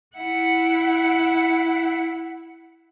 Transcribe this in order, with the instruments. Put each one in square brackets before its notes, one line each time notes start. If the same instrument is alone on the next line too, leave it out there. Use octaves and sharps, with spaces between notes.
[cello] E4 F#5